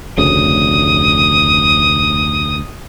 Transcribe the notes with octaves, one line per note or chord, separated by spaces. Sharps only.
F1 D2 C#3 D#6